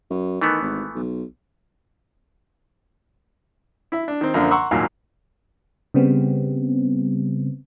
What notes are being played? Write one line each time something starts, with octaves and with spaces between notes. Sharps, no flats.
F#2
D#3 E3 A3 B3
G#1
B1
E4 E5
D4
D#3 C4
F#2 D3 F3 A#3 D4
F#5 A#5 C6 C#6 E6
G#1 D#2 A#2 F#3 A#3 F5
C#3 G3 B3 C4